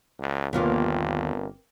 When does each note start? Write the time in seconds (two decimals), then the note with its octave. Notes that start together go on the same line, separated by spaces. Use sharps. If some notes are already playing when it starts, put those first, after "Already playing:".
0.20 C#2
0.53 G1 D#2 C3 A#3 B3 F4